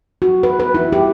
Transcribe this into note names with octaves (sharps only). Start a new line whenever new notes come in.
F#4
B4
B4
E4
G4